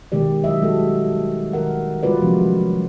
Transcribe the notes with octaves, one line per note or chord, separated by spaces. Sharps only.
B2 D#3 G#3 G4 D5
F#3 D#5 E5
G3 G#3 A#3 F#4 A4
D#3 A#4 F#5
G3 G#3 F4 F#4 B4 D5
C3 F3 F#3 G#3 A#3 C#4